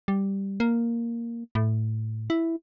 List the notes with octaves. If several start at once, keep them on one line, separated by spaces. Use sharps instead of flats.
G3
A#3
A2
E4